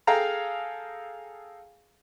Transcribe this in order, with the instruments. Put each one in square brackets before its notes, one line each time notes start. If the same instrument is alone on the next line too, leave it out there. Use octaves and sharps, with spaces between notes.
[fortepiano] G#4 A4 F5 G5 A#5